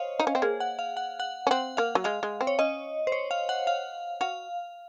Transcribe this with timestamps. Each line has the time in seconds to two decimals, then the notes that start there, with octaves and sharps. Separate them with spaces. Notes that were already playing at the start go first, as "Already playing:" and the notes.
Already playing: C5 C#5 D#5 F5
0.20 D#4
0.27 C#4
0.35 C4
0.42 A#3 G#4
0.60 F#5
0.79 F5
0.97 F#5
1.20 F#5
1.47 C#4
1.51 C4 F#5
1.77 A#3 F5
1.95 F#3
2.04 G#3 F5
2.23 G#3
2.41 C4
2.47 C#5
2.59 C#4 D#5
3.07 C5
3.12 C#5
3.31 F5
3.49 F#5
3.67 F5
4.21 F#4 F5